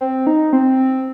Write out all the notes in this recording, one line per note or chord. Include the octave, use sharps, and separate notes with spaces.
C4
D#4
C4